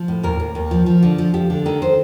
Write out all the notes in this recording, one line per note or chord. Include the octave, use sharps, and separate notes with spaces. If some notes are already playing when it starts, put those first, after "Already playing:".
Already playing: F3
A2
D#2 A#4
D#2
D#2
F3
F3
D3
F3
F3 G4
D3
D#3 A4
C5